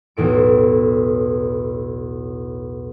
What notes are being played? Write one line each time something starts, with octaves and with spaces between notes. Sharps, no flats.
B1 E2 A2 D7